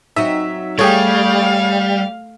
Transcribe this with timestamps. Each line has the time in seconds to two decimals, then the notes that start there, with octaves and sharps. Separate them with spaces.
0.16 F#3 C4 D#4 E5
0.79 G3 A3 G4 G#4 C#5 F5